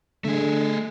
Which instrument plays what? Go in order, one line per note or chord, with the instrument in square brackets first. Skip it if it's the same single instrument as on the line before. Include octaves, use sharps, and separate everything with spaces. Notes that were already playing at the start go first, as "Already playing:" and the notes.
[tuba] D3 [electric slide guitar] A3 G#4